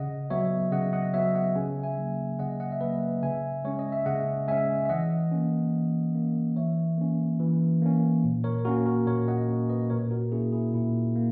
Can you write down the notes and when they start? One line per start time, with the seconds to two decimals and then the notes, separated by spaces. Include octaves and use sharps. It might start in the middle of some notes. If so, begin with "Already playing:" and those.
Already playing: C#3 D#5 F#5
0.30 F#3 B3 C#5 E5
0.72 C#3 D#5 F#5
0.93 D#5 F#5
1.14 F#3 B3 C#5 E5
1.35 D#5 F#5
1.55 C#3 G#5
1.83 E5 G#5
1.98 F#3 A#3
2.39 C#3 D#5 F#5
2.60 D#5 F#5
2.72 E5
2.81 F#3 A#3 B4 D#5
3.23 C#3 E5 G#5
3.64 G#3 C#4 C#5
3.79 D#5
3.92 E5
4.06 C#3 D#5 F#5
4.48 G#3 C#4 E5 G#5
4.85 E5
4.89 E3 D#5 F#5
5.31 A#3 C#4
5.73 E3
6.15 A#3 C#4
6.56 E3 C#5 E5
6.98 A#3 C#4
7.40 E3
7.82 A#3 C#4
8.24 A#2
8.44 A#4 C#5
8.65 A#3 C#4 F#4 A#4
8.86 F#4 A#4
9.07 A#2 A#4 C#5
9.28 D#5 F#5
9.49 A#3 C#4
9.70 B4 D#5
9.90 A#2 A#4 C#5
10.11 F#4 A#4
10.32 A#3 C#4 E4 G#4
10.52 E4 G#4
10.74 A#2 E4
11.16 A#3